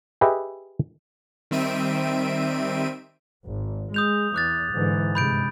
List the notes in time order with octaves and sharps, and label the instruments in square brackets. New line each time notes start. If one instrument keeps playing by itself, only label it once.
[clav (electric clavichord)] G4 G#4 B4 D#5 E5
[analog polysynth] D#3 G3 C4 E5 D7 D#7
[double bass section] G#1
[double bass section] G#3 [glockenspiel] D#6 G6 F7
[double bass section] E2 [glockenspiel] D6 F#6 A6
[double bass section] G#2 D3 E3
[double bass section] G2 C3 G#3 [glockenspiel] B5 G6 D7